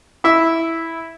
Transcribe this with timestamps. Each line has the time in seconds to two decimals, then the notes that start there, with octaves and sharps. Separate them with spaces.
0.24 E4 E5